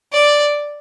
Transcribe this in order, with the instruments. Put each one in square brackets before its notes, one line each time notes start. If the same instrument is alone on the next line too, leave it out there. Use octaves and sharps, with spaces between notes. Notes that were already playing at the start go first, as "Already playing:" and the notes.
[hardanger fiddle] D5